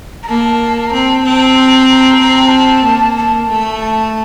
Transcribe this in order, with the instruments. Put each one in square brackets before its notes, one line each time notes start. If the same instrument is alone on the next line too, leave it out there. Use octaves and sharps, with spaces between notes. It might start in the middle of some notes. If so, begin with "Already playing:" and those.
[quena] A#5
[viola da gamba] A#3 [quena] A5
[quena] A#5
[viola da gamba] C4 [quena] A5
[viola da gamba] C4
[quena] A#5
A5
A#5
[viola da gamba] C4 [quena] A#5
[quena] A5
A#5
A5
[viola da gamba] A#3
[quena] A5
[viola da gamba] A3
[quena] A5